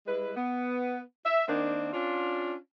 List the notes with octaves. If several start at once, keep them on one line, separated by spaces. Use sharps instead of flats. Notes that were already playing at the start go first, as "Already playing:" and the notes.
G3 G#3 E4 B4
B3
E5
D#3 A#3 C4 D4
C#4 D4 F4